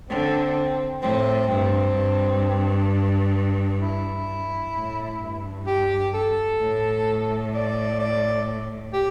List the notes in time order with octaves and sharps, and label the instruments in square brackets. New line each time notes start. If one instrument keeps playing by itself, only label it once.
[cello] D3 [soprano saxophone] C4
[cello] A2 [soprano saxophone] C4
[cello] G2 [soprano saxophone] C4
[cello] G2
[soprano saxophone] E4
[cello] A2
G2
[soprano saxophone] G4
A4
[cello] A2
[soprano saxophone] D5
D5
G4